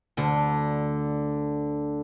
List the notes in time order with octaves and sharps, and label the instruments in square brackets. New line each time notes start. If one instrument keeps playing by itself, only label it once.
[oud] D2 D3